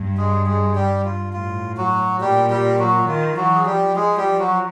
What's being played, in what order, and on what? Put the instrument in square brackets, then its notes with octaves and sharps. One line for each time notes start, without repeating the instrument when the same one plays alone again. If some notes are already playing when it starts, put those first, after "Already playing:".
Already playing: [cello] G2
[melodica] G#3 G#4
G#3 G#4
G3 G4
F4
[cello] A2 [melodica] F4
[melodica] F#3 F#4
[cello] A#2 [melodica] G3 G4
[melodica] G3 G4
F#3 F#4
[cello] D#3 [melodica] F4
[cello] E3 [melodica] F#3 F#4
[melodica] G#4
[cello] F3 [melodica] G3 G4
[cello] F3 [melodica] G#3 G#4
[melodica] G3 G4
F#3 F#4